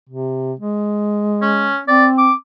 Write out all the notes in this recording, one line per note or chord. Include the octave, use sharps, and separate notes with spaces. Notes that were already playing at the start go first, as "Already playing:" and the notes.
C3
G#3
C#4
C4 D5
D6